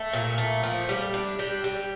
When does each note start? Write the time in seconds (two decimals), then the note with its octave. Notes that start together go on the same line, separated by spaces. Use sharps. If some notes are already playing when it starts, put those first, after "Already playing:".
Already playing: A3
0.13 A#2
0.38 A3
0.63 F3
0.89 G3
1.14 D4
1.39 G3
1.64 G3